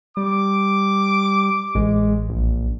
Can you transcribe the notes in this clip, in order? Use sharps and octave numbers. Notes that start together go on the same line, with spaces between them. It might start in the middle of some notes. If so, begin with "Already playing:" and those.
G3 D6
A1 G#3
A#1